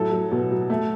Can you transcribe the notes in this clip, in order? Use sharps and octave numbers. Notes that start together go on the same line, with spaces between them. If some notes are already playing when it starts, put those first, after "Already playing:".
Already playing: A2 F#3 A4
F#3
B2
F#3
A3